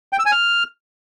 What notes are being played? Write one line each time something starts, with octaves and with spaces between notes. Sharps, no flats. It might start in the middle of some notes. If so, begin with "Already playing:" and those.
G5
E6
G#5
F6